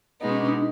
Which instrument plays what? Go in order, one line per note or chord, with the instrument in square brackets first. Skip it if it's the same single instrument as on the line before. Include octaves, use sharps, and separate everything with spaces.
[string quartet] B2 G#3 B3 D#4
[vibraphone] C#4
D4
D#4